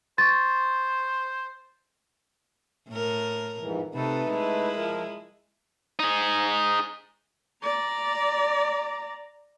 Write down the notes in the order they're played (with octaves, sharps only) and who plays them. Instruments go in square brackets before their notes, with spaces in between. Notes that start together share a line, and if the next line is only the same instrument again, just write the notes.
[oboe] C5 [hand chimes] C6 C#6 [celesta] A6
[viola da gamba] A2 A#4
[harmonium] F2 G#2 E3
[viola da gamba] C3 A4 [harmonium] A3 D#4 B4
[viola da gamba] G#3 E4
[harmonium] F3 A#4
[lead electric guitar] D#4 G#4
[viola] D5 A#5